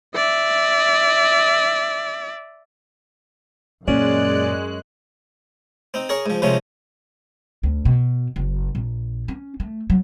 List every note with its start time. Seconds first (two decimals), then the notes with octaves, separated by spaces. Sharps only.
0.15 D5 E5
3.88 F#2 A#2 G#3 C#4 D5 F#6
5.94 C4 D#4
6.09 G#4 A#4 C#5
6.26 G#2 F3
6.42 C3 D#3 F3 G#3 C#4
7.63 D2
7.85 B2
8.36 F#1
8.75 A#1
9.28 C#4
9.60 A3
9.90 F#3